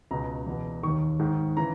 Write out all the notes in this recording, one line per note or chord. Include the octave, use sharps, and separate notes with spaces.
C#2 B2 A#5
E2 B2
D#2 D#3 C#6
G#2 D#3
C#3 E3 A#5